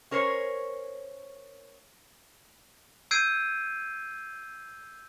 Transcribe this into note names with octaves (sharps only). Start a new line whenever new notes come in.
C#4 A#4 C5 C#5
E6 G6 G#6 C7 D7 D#7